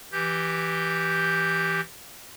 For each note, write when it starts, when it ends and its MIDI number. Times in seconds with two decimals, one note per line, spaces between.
0.12 1.81 52
0.12 1.81 67
0.12 1.81 91